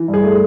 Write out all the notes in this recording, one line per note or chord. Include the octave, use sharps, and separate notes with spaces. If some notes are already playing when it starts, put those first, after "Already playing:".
Already playing: E3
G2
G#4
A3